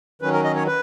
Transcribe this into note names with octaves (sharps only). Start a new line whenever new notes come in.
D#3 F#3 C#4 B4
A#4
D#5
C#5
B4